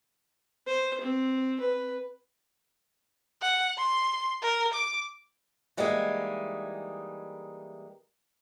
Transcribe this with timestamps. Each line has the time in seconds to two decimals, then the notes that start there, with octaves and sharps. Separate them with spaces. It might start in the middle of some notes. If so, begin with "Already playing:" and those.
0.67 C5
1.01 C4
1.60 B4
3.42 F#5
3.78 C6
4.43 A#4
4.74 D6
5.77 E3 G3 G#3 A#3 D#4 G#4